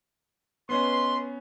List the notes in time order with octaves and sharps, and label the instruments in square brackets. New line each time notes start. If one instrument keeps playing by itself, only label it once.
[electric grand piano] B3 C#4 [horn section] B4 D#5 C6